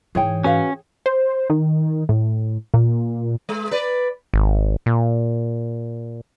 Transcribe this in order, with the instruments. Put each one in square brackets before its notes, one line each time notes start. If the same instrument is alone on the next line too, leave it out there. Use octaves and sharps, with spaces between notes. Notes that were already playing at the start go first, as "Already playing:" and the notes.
[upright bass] G#2 E3 [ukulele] G#4 C#5 G5
[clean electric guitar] C#4 [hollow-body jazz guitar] F#4 B4 F5
[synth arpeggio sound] C5
D#3
A2
A#2
[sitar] G#3
B4 D5
[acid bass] G#1
A#2